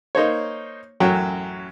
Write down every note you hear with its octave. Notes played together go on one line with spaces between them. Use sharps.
A#3 D#4 C5 C#5
A1 F#2 F#3 F#4 G5